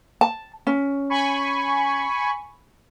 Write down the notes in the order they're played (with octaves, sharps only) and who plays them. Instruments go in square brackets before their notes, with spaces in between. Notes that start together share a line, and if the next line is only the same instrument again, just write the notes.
[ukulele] A5
C#4
[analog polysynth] G#5 B5 C#6